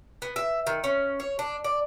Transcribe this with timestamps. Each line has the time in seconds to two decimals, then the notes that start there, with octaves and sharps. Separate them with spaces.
0.22 B3
0.36 E5
0.67 D#3
0.84 C#4
1.20 C#5
1.39 D4
1.64 D5